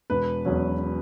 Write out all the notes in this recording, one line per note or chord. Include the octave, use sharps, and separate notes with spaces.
E1 B4
E2 B2 F#3 C#4